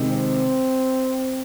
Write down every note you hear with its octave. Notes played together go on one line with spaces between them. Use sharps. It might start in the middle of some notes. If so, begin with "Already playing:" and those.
Already playing: C3 D#3 G#3
C4